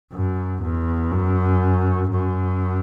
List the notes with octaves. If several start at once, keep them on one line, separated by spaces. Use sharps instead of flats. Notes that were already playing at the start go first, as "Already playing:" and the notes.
F#2
E2
F#2
F#2